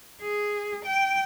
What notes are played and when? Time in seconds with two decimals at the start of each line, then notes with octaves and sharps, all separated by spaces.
0.21 G#4
0.85 G5